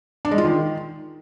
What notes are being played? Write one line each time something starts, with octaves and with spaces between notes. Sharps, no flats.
D4
G#3
F4
D#3